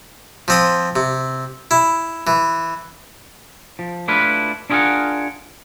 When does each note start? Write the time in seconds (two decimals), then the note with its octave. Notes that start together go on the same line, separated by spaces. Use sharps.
0.48 F3 C4 D#6
0.96 C3
1.71 E4
2.27 E3
3.79 F3
4.08 A3 D4 E4 F4 B4
4.70 D4 E4 F4 G#4 A#4 F#5